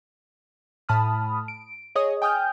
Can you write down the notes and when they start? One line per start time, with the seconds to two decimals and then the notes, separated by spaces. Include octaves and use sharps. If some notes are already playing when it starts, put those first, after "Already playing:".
0.89 A2 A5 B5 D#6 F6
1.48 D7
1.95 G#4 C#5 D#5 D#6
2.22 G5 G#5 D#6 F6 G6